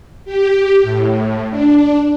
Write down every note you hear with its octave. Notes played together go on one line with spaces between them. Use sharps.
G4
A2
D4